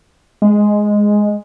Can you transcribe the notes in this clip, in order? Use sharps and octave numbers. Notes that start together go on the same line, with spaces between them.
G#3